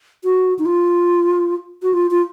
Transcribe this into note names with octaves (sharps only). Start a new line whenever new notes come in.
F#4
D#4
F4
F#4
F4
F4